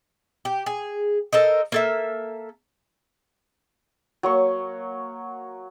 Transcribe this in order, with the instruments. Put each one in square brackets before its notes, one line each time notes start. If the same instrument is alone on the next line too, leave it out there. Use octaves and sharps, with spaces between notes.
[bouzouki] G4
G#4
A4 A#4 C5 D#5
A#3 A4 E5
[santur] F#3 A#3 C#6